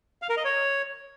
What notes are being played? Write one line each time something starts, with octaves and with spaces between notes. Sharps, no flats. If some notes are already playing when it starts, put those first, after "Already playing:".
F5
A#4
D#5
C#5